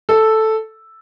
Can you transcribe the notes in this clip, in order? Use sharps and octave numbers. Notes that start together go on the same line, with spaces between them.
A4